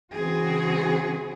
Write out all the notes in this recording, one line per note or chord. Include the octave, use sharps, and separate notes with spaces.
C#3 E3 C4 F#4 G#4